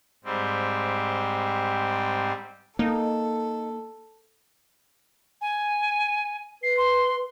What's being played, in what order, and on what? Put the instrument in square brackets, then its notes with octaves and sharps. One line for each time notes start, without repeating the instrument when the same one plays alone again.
[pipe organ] G#2 G3 C4
[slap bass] A#3 [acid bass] D#4 [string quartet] A4
[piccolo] G#5
[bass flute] B4 [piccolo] C7
[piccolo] C6